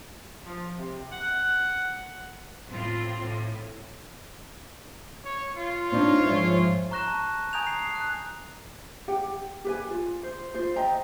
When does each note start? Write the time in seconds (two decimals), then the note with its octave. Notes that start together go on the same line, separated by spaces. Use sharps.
0.46 F3
0.78 C3
1.12 F#5
2.70 A2 C4 F4
3.22 A2
5.25 C#5
5.57 F4
5.92 C4 D4 D#4 C#5
6.26 G#2 F3 C5 E5
6.91 A#5 C#6 F#6 A#6 E7
7.07 A5
7.53 G#5 A#5 D#6 G6 G#6 F7
7.67 C7
7.93 A5 F#6
9.08 G4 F#5 G5
9.65 G4 B4 G#5
9.91 F4
10.23 C5
10.54 F4 C5
10.76 D#5 E5 G5 A#5